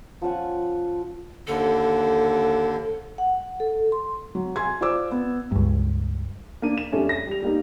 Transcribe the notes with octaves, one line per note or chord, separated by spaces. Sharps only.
F3 C#4 F#5 C#6
D#2 D3 A4
F#5
A4
C6
F#3
G#5 C6 G#6
F4 C5 D5 D6 E6
B3
C#2 G2
A#3 D4 D#7
E7
F2 G3 A3 C#4 D4
A#6
G3 F7
G3 A#3 D#4